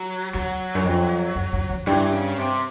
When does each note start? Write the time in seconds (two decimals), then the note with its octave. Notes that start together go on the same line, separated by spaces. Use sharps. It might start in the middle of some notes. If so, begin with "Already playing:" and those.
Already playing: F#3
0.34 E2 F#3
0.75 F#2
0.85 F2
1.35 F#2
1.53 F2
1.69 F2
1.87 G2 E3
2.12 C#3
2.38 C3